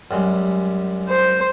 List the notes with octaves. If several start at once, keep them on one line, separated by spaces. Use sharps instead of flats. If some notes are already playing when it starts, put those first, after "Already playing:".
F#2 G3 G#3
C5